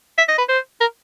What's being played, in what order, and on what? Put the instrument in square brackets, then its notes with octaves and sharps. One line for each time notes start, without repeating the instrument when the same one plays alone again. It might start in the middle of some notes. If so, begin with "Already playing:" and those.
[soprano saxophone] E5
D#5
B4
C5
A#4